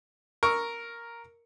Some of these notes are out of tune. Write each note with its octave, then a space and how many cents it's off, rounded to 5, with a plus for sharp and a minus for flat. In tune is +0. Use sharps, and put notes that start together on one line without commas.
A#4 +0 C#6 +0 E6 -5